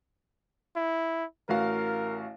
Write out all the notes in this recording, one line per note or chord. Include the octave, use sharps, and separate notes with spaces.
E4
A1 F#4 A#4 F5